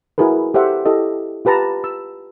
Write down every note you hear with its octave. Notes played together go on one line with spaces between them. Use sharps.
E4 F#4 G#4 A#4 B4
G4 A4 C5 E5 F#5
E4 G4 A4 D#5
F4 G4 B4 A5 A#5
E6